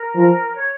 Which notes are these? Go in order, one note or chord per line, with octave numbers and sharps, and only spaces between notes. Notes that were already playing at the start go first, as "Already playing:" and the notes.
Already playing: A#4
F3
C#5